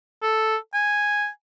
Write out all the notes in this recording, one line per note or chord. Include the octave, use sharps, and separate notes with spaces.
A4
G#5